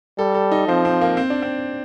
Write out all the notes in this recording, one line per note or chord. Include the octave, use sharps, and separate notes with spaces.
G3 A4
A4
D#4
F3 C4
C4
A#3
C4
D4
C4